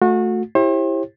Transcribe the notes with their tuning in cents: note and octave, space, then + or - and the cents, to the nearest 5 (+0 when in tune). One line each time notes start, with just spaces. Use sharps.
A3 +0 F#4 -30
E4 +0 G4 +10 C5 +40